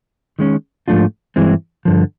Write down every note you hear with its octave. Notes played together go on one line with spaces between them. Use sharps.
D#3 G#3 C#4
G#2 F3 A3 D4 F4
G2 E3 G#3 C4 E4
G2 D3 F3